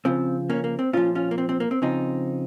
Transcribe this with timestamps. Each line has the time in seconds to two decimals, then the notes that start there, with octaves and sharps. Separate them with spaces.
0.05 C#3 F3 C4
0.50 A#3 C#4
0.64 A#3
0.79 C4
0.93 A#2 F3 C#4 F4
1.15 C#4 F4
1.31 A#3
1.38 C4
1.49 C4
1.60 A#3
1.71 C4
1.82 C#3 F3 C4 D#4